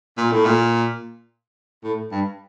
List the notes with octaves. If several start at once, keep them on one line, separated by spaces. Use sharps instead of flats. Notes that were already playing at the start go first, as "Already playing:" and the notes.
A#2
A2
A#2
A2
G2